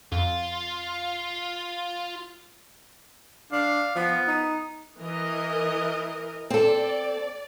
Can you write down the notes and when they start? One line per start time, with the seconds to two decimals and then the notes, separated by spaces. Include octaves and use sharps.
0.12 F2 F4
3.52 D4 F5
3.96 F3 B3
4.28 D#4
4.99 E3 A#4 D#5
6.50 C4 A4 D5